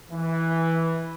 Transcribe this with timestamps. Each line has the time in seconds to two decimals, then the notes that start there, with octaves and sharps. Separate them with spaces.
0.11 E3